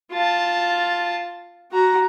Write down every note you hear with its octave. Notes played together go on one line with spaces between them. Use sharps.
F4 A5
F#4 A#5